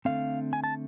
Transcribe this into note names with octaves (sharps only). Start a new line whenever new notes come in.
D3 A3 C4 F5
G#5
A5